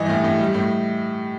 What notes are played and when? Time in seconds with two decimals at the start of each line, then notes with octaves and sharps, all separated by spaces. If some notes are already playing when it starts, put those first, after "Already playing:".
Already playing: G2 E3 D#5
0.10 A2
0.24 A2
0.40 G3
0.54 A2